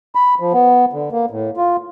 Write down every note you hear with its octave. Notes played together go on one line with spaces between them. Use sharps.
B5
F3
B3
D3
A#3
A2
F4